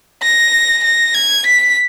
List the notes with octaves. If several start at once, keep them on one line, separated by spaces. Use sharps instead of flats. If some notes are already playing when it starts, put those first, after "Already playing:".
A#6
A#6
G#6
B6